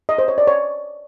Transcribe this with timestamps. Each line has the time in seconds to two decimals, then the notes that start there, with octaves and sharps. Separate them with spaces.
0.09 D#5
0.18 C5
0.28 C#5
0.38 D5
0.47 C#5